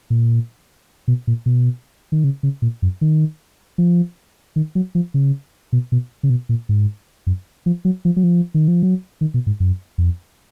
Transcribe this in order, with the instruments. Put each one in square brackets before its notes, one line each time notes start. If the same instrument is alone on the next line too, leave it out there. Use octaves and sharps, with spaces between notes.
[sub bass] A#2
B2
A#2
B2
D#3
C#3
C#3
A#2
F#2
D#3
F3
D#3
F#3
F3
C#3
B2
B2
C#3
B2
A#2
G#2
F#2
F3
F#3
F3
F#3
F3
D#3
F3
F#3
D#3
B2
G#2
F#2
F2